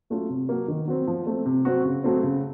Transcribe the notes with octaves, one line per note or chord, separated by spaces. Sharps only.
F#3 A3 C#4 F4
C3
F#3 A#3
D#3
F#3 C4
F3
A3 C4
C3
F#3 C4 F#4
C#3
F#3 A3 C4
C#3